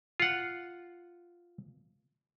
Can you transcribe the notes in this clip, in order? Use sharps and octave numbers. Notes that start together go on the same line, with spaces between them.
F4 F#5